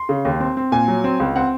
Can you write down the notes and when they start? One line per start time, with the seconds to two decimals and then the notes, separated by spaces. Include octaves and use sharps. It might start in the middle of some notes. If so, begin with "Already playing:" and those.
Already playing: C6
0.09 C#3
0.25 D#2
0.40 C4
0.57 C4
0.72 A#2 G#5
0.88 F#3
1.04 C4
1.20 C#2
1.36 C4 F#5